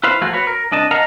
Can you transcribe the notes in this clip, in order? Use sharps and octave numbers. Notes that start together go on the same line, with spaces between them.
E4 B4 C5 F5
F3 A3 A#3 F4 F#4 G#4
F#4 B4 C#5
A#4
C2 D4 D#5 A5
A#4 D#5 F5 F#5 A5 A#5